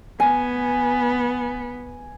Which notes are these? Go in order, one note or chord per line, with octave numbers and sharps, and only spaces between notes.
B3 G#5